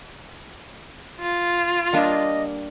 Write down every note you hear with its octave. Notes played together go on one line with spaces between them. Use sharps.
F4
G3 A#3 D4 D#5